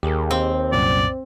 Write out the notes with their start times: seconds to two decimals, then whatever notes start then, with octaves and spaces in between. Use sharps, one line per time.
0.03 D#2 G4 G#4 A#4
0.31 C4
0.72 C2 F#2 A#2 D5